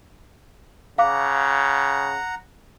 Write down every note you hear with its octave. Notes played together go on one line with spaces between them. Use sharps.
C#3 F5 F#5 A#5 D6